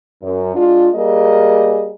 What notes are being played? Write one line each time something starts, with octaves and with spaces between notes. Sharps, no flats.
F#2
G#3 D4 F4
G3 A#3 G#4 A#4 D#5